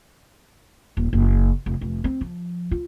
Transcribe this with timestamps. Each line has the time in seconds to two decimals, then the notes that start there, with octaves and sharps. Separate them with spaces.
0.97 D#1
1.13 F#1
1.66 F1
1.81 F1
2.04 C4
2.21 F3
2.71 F4